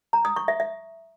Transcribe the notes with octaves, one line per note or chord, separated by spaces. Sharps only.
A#5
D#6
C#6
E5
E5